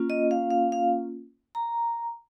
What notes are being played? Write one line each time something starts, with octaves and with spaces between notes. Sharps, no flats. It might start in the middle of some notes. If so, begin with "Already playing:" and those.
Already playing: A#3 C#4 F4
D#5
F5
F5
F5
A#5